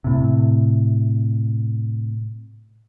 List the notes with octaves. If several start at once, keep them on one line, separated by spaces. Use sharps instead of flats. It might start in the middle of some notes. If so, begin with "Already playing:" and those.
A2 C3